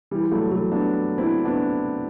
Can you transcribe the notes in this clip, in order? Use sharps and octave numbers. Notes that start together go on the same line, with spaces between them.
E3 G3
F#3 A3
F#3 A3
B3 D4
C4 E4
B3 D4